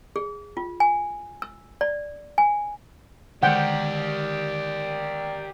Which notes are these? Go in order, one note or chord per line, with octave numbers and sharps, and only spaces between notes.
G#4
F4
G#5
E6
D5
G#5
D3 D#3 G#3 G4 A#4 D5 F#5 G5